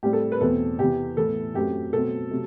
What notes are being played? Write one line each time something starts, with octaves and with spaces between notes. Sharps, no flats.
A2 G3 C4 G4
A4
B4
E2 B2 A3 C4 A4
E2 C3 E3 G4
A2 E3 B3 A4
F#2 F#3 A3 C4 G4
B2 F#3 A3 C4 A4
C3 F#3 A3